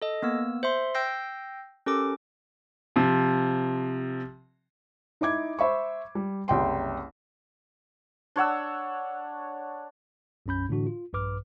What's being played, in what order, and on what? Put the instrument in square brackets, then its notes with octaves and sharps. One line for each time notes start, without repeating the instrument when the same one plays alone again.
[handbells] A4 D#5
A#3 B3 E6
C5 E5 C6
G5 E6 G6 A#6 C7
C#4 G4 A4 A#4 D6
[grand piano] C3 F3
[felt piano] D#4 E4 D6 G#6
C5 E5 B5 C#6
G3
F#1 C2 G5 C6
[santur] D4 C#5 F#5 E6
[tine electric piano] B1 F#2 C#4 B5 G6
A2 D3 E3 D4 F#4
F4
A#1 G2 B4 D6 F6